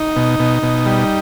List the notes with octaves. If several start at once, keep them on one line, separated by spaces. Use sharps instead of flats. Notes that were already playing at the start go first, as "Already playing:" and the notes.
Already playing: D#4
B2
B2
B2
G3